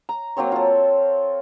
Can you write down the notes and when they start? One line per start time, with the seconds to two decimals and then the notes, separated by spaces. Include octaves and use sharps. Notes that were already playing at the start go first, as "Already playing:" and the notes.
0.09 A#5
0.37 F#3 A#3 C4 C#5
0.52 F4 A4